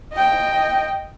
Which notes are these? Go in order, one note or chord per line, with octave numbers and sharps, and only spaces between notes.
D#5 G5